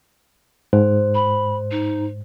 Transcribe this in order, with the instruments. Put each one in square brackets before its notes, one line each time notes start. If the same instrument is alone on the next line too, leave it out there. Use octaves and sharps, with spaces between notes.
[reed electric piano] G#2 [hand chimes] C5
[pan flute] B5
D#4